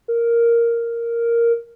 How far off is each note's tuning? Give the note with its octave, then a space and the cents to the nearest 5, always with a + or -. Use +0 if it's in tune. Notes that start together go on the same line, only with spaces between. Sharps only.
A#4 +0